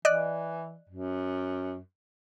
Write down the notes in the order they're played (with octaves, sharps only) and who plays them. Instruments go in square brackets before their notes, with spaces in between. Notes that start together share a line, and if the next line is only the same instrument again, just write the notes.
[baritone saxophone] E3 [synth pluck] D5 D#5 F#6
[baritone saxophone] F#2